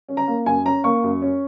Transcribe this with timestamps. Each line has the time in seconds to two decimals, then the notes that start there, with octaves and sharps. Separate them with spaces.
0.08 C#4
0.17 A#5
0.28 A#3
0.46 F#2 G#5
0.65 C#4 A#5
0.84 A#3 C#6
1.04 F#2
1.22 C#4